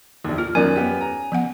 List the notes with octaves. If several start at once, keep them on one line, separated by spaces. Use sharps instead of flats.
A#1 D#2
F4 F6
F#2 D#3 C#4 A#4 D5 G#5
B3 G4
A#5
F3 B3 F#5